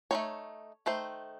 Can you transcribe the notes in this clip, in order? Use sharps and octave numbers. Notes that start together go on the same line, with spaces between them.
A3 C4 D#4 C#5
D#3 A3 C5